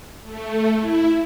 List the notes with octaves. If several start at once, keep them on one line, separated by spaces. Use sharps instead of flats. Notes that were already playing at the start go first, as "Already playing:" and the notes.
A3
E4